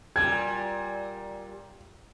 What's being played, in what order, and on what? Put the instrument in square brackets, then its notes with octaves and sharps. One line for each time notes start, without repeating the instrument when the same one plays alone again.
[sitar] A#2 G3 [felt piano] G#6